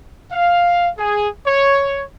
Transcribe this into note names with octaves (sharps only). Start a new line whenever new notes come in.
F5
G#4
C#5